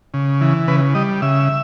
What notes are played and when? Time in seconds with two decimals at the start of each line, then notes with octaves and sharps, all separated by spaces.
0.14 C#3
0.41 E3
0.68 C#3 B4
0.95 G3 D#5
1.22 C#3 E5